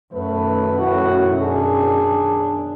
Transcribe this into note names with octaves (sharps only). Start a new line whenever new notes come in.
F#2 B2 D#3 A3 B4
A2 F#4
D4 G#4